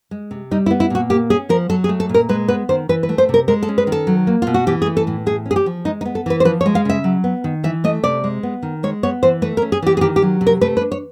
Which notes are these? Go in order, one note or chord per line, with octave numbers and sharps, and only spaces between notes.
G#3
C3
G3 D#4
E4
B3
E4
A#2 F#4
A#3 G4
C#4 G#4
F3 A#4
F#3 A4
G#4
A3
A4
A#2
A#4
G#3 B4
B3 B4
D#3 C5
E3 B4
B4
A3
C5
C3
A#4
G#3 A#4
A4
C#4
B4
D#3
A4
F#3
A#3
B2 F4
F#4
E3 G4
G#4
A3
A4
A2
A3 G#4
C#4
G#4
G4
F3
G#3 D#4
D#4
B3
A4
E3 B4
C5
F3 B4
C#5
G#3
F5
C#3 E5
F#3
B3
D#3
E3 E5
A3 D#5
C3 D5
G#3
B3
D#3
G#3 C#5
B3 C#5
E3 C5
A3 B4
A#4
C#4
G#4
E3 G4
G#4
D#3 G4
G4
F#3
C3
A#4
A3 B4
B4
D4
C#5